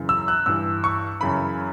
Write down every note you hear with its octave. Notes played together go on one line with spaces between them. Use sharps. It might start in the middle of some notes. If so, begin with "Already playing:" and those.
Already playing: F#2 C#3 E3
E6
F#6
G2 E3 E6
C#6
F#2 C#3 E3 B5